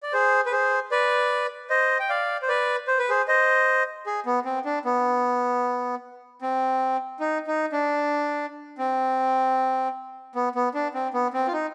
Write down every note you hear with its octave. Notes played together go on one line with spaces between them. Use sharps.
D5
G#4 C5
B4
G#4 C5
B4 D5
C5 D#5
G5
D5 F5
C5
B4 D5
C5
B4
G#4 C5
C5 D#5
G#4
B3
C4
D4
B3
C4
D#4
D#4
D4
C4
B3
B3
D4
C4
B3
C4
F4
D#4